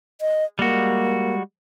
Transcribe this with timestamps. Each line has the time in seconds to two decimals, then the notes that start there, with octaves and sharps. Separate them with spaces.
0.21 D#5
0.59 G3 G#3 A#3 F#4